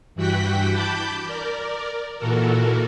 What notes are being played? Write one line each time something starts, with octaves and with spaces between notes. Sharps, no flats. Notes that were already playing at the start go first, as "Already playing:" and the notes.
G2 E3 F#4 F#5 G5 B6
A5 B5 D6 G6
A#4 D5
A#2 E3 F#4 A4 A#4